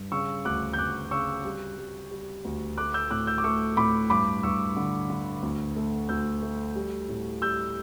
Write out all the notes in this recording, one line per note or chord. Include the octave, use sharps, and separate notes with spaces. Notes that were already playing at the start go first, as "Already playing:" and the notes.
Already playing: G2
C#3 C#6 E6
D2 D6 F#6
G6
D2 D6 F#6
C#3 C#6 E6
G3
G3
G3
D2
A3 D6 F#6
E6 G6
A2 D6 F#6
E6 G6
D6
A3 C#6 E6
A2 B5 D6
G2 B5 D6
G2 C#6 E6
D3
D3
D2
A3
D2 E6 G6
A3
G3
A2
G3 E6 G6